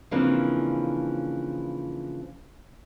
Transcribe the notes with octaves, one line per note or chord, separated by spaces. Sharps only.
C#3 E3 F3 A#3 C4 D4